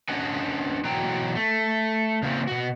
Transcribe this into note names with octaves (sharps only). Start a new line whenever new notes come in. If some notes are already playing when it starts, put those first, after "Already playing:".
C#4 D4 B4 D#5 F#5 G#5
B2 E3 F#3 F#4 G5 A#5
A3
C#3 E3 G3 A#3 C4 C#4
B2 F#4